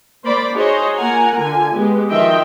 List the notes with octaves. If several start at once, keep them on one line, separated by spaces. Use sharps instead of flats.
A#3 C5 D5 B5
D#4 F#4 G#4 C5 C#5 D#5
A#3 F4 A#4 F#5 G#5 A#5
D3 F4 G#5
G#3 B3 G4
D#3 F3 F4 D#5 E5 G5